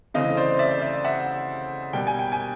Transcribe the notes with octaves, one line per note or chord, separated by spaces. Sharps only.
C#3 E3 A3 C4 D#5 F5
C5 D5
D5 E5
D5 E5
E5 F#5
B2 G3 A#3 G5
G#5
G5
G#5